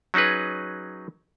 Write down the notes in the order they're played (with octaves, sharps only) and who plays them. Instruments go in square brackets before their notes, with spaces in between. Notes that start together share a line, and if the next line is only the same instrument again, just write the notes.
[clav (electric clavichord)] F#3 C#4 D#4 G#4 B4